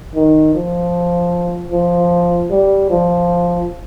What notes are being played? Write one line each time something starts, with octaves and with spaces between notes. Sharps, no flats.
D#3
F3
F3
G3
F3